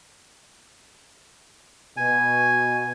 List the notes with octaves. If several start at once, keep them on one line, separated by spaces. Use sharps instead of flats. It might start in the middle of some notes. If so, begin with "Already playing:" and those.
B2 G#5